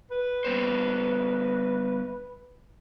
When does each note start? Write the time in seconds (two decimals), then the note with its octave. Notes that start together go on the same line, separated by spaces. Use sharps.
0.11 B4
0.44 G3 B3 C5